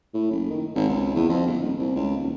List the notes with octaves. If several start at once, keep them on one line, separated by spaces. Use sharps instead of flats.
A2
F#1
D#3
G#1
C#2
E2
F2
G1
D#1
C2
C#2
D#1